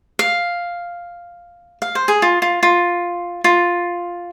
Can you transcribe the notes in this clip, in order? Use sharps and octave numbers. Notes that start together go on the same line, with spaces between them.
F5
F5
C5
G#4
F4
F4
F4
F4